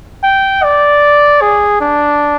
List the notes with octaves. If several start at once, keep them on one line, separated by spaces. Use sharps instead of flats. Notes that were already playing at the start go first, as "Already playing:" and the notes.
G5
D5
G#4
D4